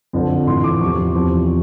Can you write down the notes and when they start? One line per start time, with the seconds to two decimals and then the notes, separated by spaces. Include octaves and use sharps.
0.13 F2 D3 F3
0.47 A2 E3 C6
0.64 D6
0.81 E2 C3 F3 C#6
1.15 E2 C3 F3